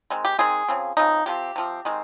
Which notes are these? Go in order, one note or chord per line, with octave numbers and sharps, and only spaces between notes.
D#3 G#3 C4
G4
D#3 G#3 C4 G#4
C#3 F3 C4
C#3 F3 C4 D#4
C3 F3 C4 G4
C3 F3 C4
D#3 G#3 C4